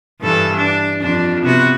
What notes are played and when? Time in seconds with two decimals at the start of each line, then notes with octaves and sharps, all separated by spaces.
0.21 G2 E3 A4
0.56 D4
1.01 F2 D4
1.44 C3 B3 F#4